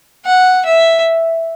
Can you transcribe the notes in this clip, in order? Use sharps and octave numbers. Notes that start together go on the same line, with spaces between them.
F#5
E5